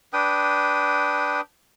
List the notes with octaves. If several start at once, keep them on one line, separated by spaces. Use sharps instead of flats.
D4 B4 G5 D#6